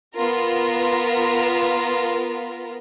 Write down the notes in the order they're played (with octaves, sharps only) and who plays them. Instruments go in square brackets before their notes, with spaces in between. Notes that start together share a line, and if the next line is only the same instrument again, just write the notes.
[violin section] B3 F4 A#4